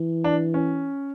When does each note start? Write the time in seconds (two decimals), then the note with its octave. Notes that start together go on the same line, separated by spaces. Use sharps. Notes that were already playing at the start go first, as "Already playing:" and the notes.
Already playing: E3
0.24 D4
0.54 C#4